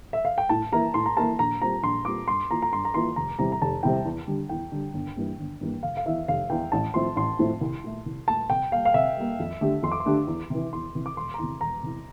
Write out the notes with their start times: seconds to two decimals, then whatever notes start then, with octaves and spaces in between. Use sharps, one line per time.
0.13 E5
0.25 F5
0.38 G5
0.49 A2 A5
0.72 E3 A#3 E4 A#4 A#5
0.94 A2 C6
1.06 A#5
1.17 E3 A#3 E4 A#4 A5
1.39 A#1 A#5
1.61 A#2 G3 C4 F4 A#5
1.83 A#1 C6
2.05 A#2 G3 C4 F4 D6
2.28 G2 C6
2.50 E3 A#3 F4 A#5
2.62 A#5
2.72 G2 C6
2.85 A#5
2.94 E3 A#3 F4 C6
3.16 F1 A#5
3.39 E2 C3 G3 C4 A#5
3.52 A#5
3.61 F1 A5
3.83 E2 C3 G3 C4 G5
4.05 E2
4.27 D3 G3
4.49 E2 G5
4.72 D3 G3
4.94 G1
5.16 G2 E3 G3 A#3
5.39 G1
5.61 G2 E3 G3 A#3
5.83 F1 F5
5.97 F5
6.05 E2 E3 E5
6.28 F1 F5
6.50 E2 E3 G5
6.72 A1 A5
6.94 A2 F3 A3 C4 C6
7.16 A1 C6
7.39 A2 F3 A3 C4
7.61 C2
7.84 A#2 A3
8.06 C2
8.28 A#2 A3 A5
8.50 C3 G5
8.72 G3 A#3 F5
8.85 F5
8.94 C3 E5
9.17 G3 A#3
9.39 F2
9.61 D3 A3 D4 G4
9.83 F2 C6
9.92 D6
10.00 C6
10.05 D3 A3 D4 G4
10.27 E2
10.50 C3 E3
10.73 E2 C6
10.95 C3 E3
11.06 D6
11.17 E1 C6
11.34 A#5
11.38 E2 C3 C6
11.61 E1 A#5
11.83 E2 C3